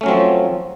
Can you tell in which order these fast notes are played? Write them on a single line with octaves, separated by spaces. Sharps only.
A3 C#4 F#3 C4 F3